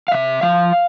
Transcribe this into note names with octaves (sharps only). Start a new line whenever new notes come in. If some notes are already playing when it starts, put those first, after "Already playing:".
F5
C3 E5
F3 F5